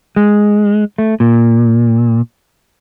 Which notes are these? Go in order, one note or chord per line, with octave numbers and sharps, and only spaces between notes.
G#3
A3
A#2